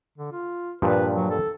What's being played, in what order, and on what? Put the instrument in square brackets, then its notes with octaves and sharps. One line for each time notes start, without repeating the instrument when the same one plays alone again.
[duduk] D3
F4
[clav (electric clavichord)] G2 A#2 F3 [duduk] B4
[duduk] F#3
A4